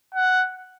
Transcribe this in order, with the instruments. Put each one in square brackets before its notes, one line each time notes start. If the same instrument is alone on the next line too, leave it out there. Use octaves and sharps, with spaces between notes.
[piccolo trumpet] F#5